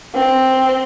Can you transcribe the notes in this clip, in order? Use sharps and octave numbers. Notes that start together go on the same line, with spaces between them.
C4